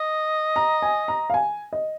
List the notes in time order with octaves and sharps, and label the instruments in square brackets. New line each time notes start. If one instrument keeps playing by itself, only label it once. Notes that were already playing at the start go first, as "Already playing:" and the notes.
Already playing: [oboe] D#5
[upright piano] A#5
G#5
A#5
F5
G#5
D#5